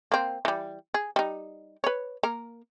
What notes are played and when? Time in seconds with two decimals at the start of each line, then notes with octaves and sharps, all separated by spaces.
0.12 A#3 C4
0.45 E3 G3
0.94 G#4
1.16 G3 D#4
1.84 B4 C#5
2.23 A#3 A#4